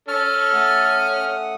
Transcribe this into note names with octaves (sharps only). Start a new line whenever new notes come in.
C#4 A4 C#6 F6
A3 F#5 D#6